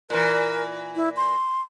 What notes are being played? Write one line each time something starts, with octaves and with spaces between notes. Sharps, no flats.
A#2 E3 A#4
E4
C6